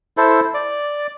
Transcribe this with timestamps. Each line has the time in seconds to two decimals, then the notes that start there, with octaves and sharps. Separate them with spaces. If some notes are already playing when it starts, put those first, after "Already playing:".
0.17 E4 A4 C5
0.54 D5